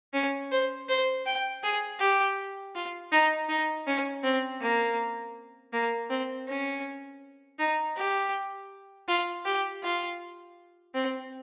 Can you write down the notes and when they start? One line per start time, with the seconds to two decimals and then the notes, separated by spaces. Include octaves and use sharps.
0.14 C#4
0.51 C5
0.88 C5
1.26 G5
1.63 G#4
2.00 G4
2.75 F4
3.12 D#4
3.49 D#4
3.87 C#4
4.24 C4
4.61 A#3
5.73 A#3
6.10 C4
6.48 C#4
7.59 D#4
7.97 G4
9.08 F4
9.45 G4
9.83 F4
10.94 C4